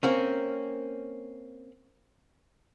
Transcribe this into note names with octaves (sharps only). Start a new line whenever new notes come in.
A#3 C4 C#4